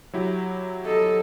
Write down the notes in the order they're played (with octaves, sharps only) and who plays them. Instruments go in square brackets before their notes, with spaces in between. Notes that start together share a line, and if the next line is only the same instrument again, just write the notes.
[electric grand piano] F#3 E4 G4
[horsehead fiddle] A4 D#5